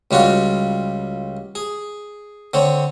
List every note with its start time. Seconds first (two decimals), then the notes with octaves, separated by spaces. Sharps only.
0.11 C#2 G3 F4 F#4 F#5
1.55 G#4
2.54 D3 C4 C#5